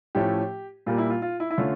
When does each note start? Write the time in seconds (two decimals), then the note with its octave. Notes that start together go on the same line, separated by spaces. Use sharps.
0.15 A2 F3 A3 C#4 G4
0.86 A#2 G3 A#3 F4
0.98 E4
1.10 F4
1.22 F4
1.40 E4
1.51 E4
1.58 D3 A3 C#4 F4